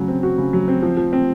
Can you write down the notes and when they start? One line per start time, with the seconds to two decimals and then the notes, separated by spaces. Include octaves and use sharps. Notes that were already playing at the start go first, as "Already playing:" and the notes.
Already playing: C#3 F#3 F#4
0.08 C4
0.23 F#4
0.38 C#3
0.53 F#3
0.68 C4
0.82 F3
0.97 F3
1.13 C4